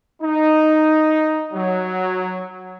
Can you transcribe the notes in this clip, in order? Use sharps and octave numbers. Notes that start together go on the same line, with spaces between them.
D#4
F#3